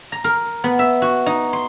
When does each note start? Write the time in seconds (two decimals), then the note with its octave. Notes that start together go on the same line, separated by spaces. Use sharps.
0.12 A#5
0.24 A#4
0.64 B3
0.79 E5
1.02 F#4
1.26 D#4
1.53 C6